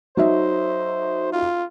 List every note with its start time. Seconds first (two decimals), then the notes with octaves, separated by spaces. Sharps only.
0.17 F#3 D#4 C5 E5
1.32 F4